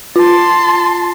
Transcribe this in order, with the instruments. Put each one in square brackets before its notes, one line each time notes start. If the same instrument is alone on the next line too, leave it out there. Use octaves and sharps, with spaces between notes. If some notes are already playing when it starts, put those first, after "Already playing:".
[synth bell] F4 [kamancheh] A5 C6